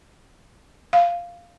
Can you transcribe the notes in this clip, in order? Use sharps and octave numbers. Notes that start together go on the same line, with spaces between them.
F5